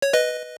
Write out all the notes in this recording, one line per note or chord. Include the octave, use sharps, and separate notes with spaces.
C#5
B4 D#5